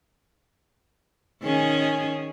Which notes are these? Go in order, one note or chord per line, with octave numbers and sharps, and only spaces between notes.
D#3 C#4 G#4